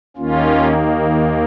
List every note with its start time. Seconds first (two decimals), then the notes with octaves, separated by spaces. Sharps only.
0.17 D#2 D#3 A#3 C#4 F4